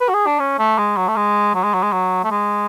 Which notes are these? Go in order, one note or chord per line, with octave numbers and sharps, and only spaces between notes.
B4
F#4
G#4
D4
C#4
A3
G#3
F#3
A3
G#3
F#3
G#3
F#3
G#3
F#3
A3
G#3